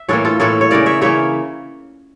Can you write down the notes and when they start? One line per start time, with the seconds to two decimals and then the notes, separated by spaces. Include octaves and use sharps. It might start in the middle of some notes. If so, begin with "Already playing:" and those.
Already playing: E5
0.09 A2 E3 A#3 A4 C#5
0.25 F4 A4
0.40 A2 E3 A#3 A4 C#5
0.61 C#5
0.70 C#3 E3 A#3 A#4 D5
0.86 C#5 E5
1.01 C#3 E3 A#3 C#5 E5